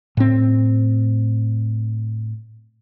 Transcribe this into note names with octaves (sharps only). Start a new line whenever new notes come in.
A2 C4